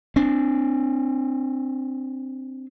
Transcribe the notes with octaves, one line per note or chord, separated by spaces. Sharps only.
C4 D4